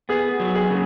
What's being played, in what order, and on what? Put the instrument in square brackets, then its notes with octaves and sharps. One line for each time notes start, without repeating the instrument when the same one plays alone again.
[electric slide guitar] B3 [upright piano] G#4
[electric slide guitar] F#3
[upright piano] G#4
[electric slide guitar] C#3